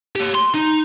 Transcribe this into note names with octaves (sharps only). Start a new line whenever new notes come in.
G4 C#5
C6
D#4